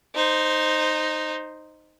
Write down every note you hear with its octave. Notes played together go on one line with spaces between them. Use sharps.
D#4 C5